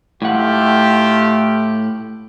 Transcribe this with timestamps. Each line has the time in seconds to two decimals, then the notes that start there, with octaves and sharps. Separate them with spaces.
0.22 A2 A3 F4 G4 F#5